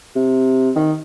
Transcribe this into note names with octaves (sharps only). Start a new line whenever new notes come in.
C3
D#3